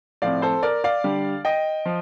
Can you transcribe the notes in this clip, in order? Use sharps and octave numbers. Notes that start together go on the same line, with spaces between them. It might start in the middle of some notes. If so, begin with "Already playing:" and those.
A2 F3 C4 D5 F5
A4 C5
A#4 D5
D5 F5
D3 G3 D4
D#5 G5
F3